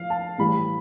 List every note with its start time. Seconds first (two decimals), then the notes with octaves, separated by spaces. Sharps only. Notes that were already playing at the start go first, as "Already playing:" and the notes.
Already playing: F3 F5
0.10 A5
0.38 A2 E3 G3 B5